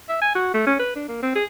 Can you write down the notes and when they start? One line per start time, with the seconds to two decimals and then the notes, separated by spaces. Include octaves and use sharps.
0.09 E5
0.22 G#5
0.35 F#4
0.54 A3
0.67 C#4
0.79 B4
0.96 D4
1.08 A#3
1.23 C4
1.35 G#4